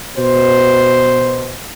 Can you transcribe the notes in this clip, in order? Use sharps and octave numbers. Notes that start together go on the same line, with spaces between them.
B2 C5